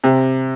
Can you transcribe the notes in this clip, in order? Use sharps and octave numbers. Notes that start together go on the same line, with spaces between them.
C3